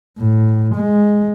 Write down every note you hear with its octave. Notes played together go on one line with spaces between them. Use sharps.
A2
G#3